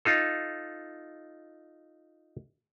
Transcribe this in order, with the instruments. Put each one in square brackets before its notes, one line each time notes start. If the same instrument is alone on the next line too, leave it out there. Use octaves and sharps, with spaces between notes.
[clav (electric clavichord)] D#4 F4 A4